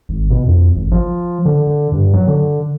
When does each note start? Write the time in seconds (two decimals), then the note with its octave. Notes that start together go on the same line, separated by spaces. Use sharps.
0.09 G#1
0.30 B2
0.47 F2
0.76 G#1
0.92 F3
1.45 D3
1.67 D3
1.92 G2
2.14 F#3
2.27 D3